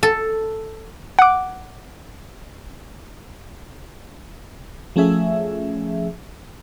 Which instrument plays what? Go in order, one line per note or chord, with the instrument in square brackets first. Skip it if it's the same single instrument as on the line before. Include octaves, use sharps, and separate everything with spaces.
[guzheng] A4
[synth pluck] F#5 D6
[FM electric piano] F3 A3 C#4 G#4 E5